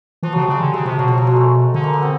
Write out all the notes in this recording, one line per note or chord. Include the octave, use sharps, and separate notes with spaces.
E3 F3
C#3 F#3
G3
C#3 G#3
D3
C#3 G#3
C3 F3
B2 F#3
F3
F#3
G#3
A3
D3 G#3
A#3
B3
C4